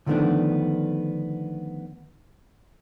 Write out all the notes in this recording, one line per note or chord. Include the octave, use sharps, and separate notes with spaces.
D3 D#3 F3 A3 B3 D4